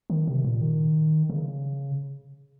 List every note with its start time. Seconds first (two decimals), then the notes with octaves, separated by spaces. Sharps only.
0.10 D#3
0.27 C3
0.44 A#2
0.61 D#3
1.30 C#3